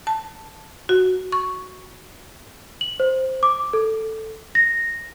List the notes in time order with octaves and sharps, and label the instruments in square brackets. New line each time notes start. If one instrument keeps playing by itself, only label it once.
[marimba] A5
F#4
C#6
[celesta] F#7
C5
D6
A4
A#6